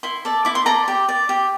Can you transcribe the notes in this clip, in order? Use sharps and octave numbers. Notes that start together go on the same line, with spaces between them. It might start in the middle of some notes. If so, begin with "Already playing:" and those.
E4 C6
A4 D5
E4 D6
C6
A4 D5 A#5
G4
D5
G4